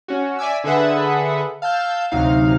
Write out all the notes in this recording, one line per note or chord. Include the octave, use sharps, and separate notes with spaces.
C#4 F#4
D5 E5 G#5 D6 E6
D3 G#4 A4 B4 E5 F#5
F5 A5 E6 G6
D2 C3 F#3 D#4 F5